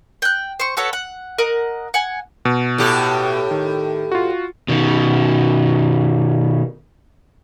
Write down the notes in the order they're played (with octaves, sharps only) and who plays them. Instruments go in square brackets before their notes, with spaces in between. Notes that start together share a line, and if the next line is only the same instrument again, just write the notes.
[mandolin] G5 F#6
C5 C#6
F#4 A4 B4 C#5
F#5
A#4 D#5 F#5
F#5 G#5
[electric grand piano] B2
[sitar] A2 G4
[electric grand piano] D#3
F4 F#4
[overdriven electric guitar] B2 D#3